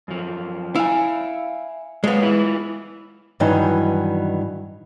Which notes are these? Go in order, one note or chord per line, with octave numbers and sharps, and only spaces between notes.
F#2 F3
E4 F5 G#5
A#2 G#3 B3 C#5 F5
E4 F4 B4
G2 D#3 E3 F#3 D#4